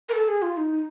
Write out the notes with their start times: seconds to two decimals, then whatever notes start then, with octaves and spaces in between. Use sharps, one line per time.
0.09 A#4
0.15 A4
0.28 G#4
0.42 F4
0.57 D#4